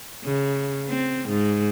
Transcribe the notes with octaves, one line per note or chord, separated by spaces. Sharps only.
C#3
C4
G#2